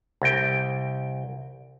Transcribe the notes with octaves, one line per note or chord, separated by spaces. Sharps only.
C2 G5